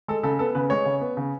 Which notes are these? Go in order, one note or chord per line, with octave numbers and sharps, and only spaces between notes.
G#3 A4
C#3 A4
B3 A4
C#3 B4
G#3 C#5
C#3
B3
C#3